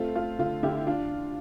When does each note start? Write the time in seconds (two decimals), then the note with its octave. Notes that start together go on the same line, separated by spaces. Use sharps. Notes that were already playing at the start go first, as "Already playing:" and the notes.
Already playing: A3 C4 F4
0.16 A3 F4
0.39 D3 F4
0.63 D3 E4 G4
0.87 D4 F4